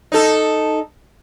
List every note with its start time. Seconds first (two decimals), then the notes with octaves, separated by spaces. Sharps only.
0.12 D#4 A4